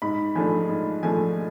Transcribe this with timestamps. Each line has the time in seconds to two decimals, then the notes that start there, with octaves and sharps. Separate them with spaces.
0.02 G#2 B5
0.35 F3 A3 D4 G#5
0.69 G#2
1.03 F3 A3 D4 G#5